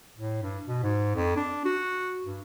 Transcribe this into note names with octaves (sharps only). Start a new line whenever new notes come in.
A2
G2
B2
G#2
F2
D4
F#4
G2